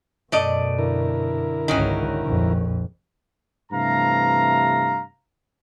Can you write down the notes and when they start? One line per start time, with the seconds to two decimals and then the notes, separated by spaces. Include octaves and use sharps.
0.32 F#2 B2 A3 D5 D#5
0.78 D3 E4 A#4
1.68 G#1 C#2 D#3 F#3 C#4
2.22 A#1 F2
3.72 G2 C3 E3 A3 F5 A#5